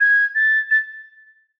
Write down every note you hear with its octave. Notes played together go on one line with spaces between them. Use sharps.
G#6
A6
A6